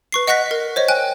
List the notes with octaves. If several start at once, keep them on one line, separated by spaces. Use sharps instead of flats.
B4 C#6 C7
D#5 F#5 C#6 F#6 A#6 B6
A#4
C5 C#5 D#5
G5 G#5 F#6